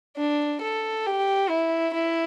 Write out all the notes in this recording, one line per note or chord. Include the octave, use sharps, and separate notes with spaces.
D4
A4
G4
E4
E4